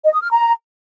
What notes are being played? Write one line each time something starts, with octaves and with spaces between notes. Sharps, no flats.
D#5
D#6
F6
A#5